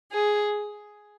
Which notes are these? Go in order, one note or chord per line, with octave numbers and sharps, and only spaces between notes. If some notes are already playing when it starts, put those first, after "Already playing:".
G#4